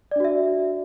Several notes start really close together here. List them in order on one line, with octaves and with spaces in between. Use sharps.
D5 D4 F#4 E5